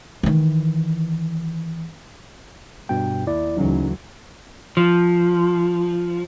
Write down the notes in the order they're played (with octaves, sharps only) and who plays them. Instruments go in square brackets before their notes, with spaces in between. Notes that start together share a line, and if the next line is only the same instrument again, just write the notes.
[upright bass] D#3 E3
[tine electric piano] G2 B2 G5
D#2 E4 D5
[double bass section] D2 E3 F#3 [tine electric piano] C#3 C#4 D#4
[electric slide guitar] F3